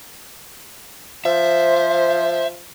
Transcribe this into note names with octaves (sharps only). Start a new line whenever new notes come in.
F3 C5 E5